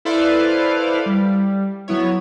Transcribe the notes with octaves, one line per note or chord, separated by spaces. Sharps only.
E4 A4 B4 C5 D5 F5
G3
F#3 B3 E4 C#5